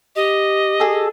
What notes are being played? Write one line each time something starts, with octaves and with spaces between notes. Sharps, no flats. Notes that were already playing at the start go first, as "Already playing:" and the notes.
G4 D#5
G#4 A4